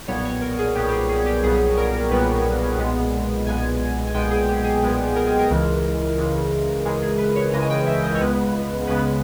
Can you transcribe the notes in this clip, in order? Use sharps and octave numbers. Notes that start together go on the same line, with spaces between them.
B1 A#2 G3 B3 C#5
C#5
A#4
G#4
B1 A#2 G3 B3 G4
G4
G#4
G#4
G4
B1 A#2 G3 B3 G#4
A#4
B1 A#2 G3 B3 B4
B1 A#2 G#3 B3
B1 A#2 G#3 B3 G#5
G#5
B1 A#2 G#3 B3 G5
G#4
G4
G#4
B1 A#2 G#3 B3
A#4
G#4
A#4
C#2 C#3 E3 G#3
C#2 C#3 E3 G#3
C#2 C#3 E3 G#3 G#4
G#4
B4
C#5
C#2 C#3 E3 G#3 D#5
G#5
G5
E5
D#5
C#5
C#2 C#3 G#3 B3 B4
C#2 C#3 G#3 B3 B4